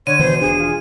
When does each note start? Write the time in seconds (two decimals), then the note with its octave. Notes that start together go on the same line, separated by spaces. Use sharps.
0.07 D3 C#5 D#7
0.19 B2 D#3 E3 C5
0.41 E1 D4 G#4
0.60 F4